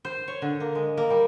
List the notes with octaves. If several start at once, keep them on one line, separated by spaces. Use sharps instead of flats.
C5
C#5
D3
A#3
G#3
A#3
G3